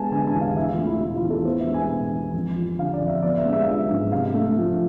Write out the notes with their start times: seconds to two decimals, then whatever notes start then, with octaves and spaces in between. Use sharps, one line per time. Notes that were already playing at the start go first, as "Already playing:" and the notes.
Already playing: G#3 B3 G#5 A5
0.11 D3 G#5
0.27 G#5
0.33 E2
0.41 F5
0.56 E2 E5
0.72 F4
0.78 A3
0.87 E4
1.00 B2 E4
1.15 F4
1.23 E2
1.30 A4
1.45 B3 C5
1.60 E5
1.67 G#3
1.74 G#5
1.90 B2
2.12 E2
2.33 F2
2.56 F3
2.78 D3 F5
2.94 D5
3.01 F2
3.08 E5
3.22 B3 D5
3.37 E5
3.46 G#3
3.53 E5
3.62 F5
3.68 F3 E5
3.90 G#2
4.11 C3 F5
4.34 A3
4.57 F3